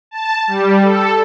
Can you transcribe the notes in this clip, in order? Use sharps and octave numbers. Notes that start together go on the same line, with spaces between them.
A5
G3
A4